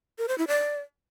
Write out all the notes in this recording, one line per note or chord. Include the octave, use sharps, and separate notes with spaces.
A#4
C5
E4
D5